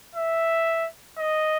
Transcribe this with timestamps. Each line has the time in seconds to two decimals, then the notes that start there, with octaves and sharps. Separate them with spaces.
0.16 E5
1.18 D#5